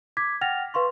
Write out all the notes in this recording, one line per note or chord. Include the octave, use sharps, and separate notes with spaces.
D6 G#6 B6
F#5 G5 F6 A6 A#6 F7
B4 F5 C6 C#6